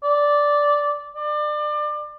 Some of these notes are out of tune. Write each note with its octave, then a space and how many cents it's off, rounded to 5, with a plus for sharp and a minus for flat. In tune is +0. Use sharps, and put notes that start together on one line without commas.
D5 -5
D5 +30